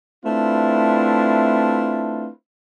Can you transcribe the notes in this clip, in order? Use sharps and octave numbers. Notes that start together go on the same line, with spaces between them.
A3 C4 D4 E4 F4 B4